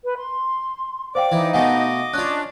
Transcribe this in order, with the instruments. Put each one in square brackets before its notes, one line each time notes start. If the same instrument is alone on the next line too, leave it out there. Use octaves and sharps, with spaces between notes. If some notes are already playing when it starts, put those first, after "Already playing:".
[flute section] B4
C6
[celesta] C5 F5 G5 [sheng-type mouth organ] D5 D6
[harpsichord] E3 [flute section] D#4
[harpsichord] B2 A3 [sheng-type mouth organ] D#5 D6 [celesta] F5 F#5 G#5
[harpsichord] C#4 F4 [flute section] D4 [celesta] F#6